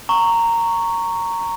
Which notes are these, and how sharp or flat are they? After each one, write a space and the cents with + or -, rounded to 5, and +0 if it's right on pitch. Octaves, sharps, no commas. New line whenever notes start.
A#5 -15 C#6 +0